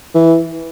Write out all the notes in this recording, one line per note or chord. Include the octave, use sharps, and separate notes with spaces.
E3